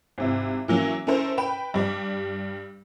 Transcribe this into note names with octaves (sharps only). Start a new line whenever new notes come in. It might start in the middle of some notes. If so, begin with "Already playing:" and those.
G#1 C3 E4
E3 F#3 A#3 C#4
C#4 E4 A4 A#4 C5
B4 G5 B5 E7
G2 G3 D6